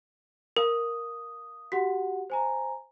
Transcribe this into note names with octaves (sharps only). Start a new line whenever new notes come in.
A#4 F5 D#6
F#4 G4 F#5 B6
C5 G#5 A#5